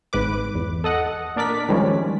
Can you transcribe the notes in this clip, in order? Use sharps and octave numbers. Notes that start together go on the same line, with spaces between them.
G#1 G#2 B4 D6
E2
A4 D#5 F#5
A#2 D4 A#4 D5 B6
D#3 F3 G3 G#3 C#4